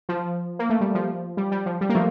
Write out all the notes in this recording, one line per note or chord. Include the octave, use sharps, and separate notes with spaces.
F3
A#3
A3
G3
F3
G3
G3
F3
G3
A#3
F3 A3